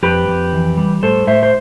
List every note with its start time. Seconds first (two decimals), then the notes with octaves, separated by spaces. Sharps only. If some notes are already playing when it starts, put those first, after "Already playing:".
0.03 F2 G4 B4
0.28 F2
0.53 E3
0.77 G3
1.03 A2 A4 C5
1.27 A2 C5 E5
1.43 C5